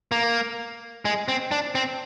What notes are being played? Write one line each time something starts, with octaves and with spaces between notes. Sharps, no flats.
A#3
G#3
C4
D4
C4